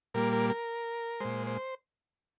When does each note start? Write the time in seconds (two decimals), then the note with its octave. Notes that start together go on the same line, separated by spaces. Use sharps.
0.14 A#2 G3 A#3 A#4
0.33 A#4
0.50 A#4
1.20 A#2 G#3 C5
1.47 C5